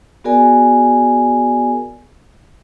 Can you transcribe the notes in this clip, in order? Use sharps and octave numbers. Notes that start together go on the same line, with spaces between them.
B3 F#4 G#4 A#4 D5 G#5